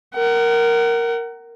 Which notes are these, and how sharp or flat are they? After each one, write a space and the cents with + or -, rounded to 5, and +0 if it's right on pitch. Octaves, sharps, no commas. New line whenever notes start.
A#4 +0 F#5 +30